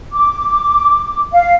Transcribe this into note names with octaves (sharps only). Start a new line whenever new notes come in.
D6
F5